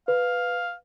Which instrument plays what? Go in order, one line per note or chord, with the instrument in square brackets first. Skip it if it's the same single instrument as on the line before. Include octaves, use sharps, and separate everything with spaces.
[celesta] B4 [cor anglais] F5